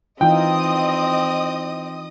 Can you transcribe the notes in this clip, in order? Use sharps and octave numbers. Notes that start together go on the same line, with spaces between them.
E3 C4 D#4 F4 D#5 G5 D#6